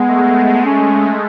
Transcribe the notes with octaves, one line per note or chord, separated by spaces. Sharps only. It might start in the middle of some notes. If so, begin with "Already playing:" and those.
Already playing: G#3 B3
A3
C#4